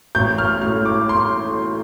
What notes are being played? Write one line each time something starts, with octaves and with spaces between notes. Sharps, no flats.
A1 G6
F6
A2 F6
D6
C6